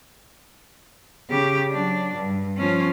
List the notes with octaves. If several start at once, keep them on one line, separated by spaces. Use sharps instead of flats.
C#3 G4
F#3 D4
G2
F3 C#4